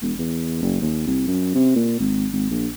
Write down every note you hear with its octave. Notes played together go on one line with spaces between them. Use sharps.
E1
E2
F#1
D#2
C2
F#2
C3
A#2
G#1
G#1
A#1